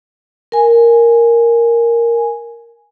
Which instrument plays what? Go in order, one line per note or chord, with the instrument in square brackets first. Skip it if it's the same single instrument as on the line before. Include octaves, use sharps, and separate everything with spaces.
[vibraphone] A#4 G#5